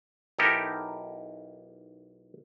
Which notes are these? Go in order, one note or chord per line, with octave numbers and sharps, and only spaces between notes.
B1 D#4 E4 G4 A4 A#4